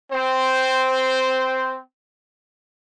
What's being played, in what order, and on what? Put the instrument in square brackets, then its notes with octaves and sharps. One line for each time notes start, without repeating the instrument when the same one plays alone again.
[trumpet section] C4 C5